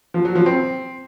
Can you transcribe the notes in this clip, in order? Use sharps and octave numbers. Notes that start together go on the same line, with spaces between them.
F3
F#3
F3
C4